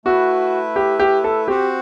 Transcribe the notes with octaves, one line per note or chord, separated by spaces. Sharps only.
A3 E4 F#4 B4 E5
G4
G4
A4
C4 F#4 G4 C5 F#5